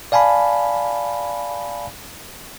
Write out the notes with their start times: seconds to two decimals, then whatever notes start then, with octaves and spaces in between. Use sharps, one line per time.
0.12 D5 F5 G#5 A5 B5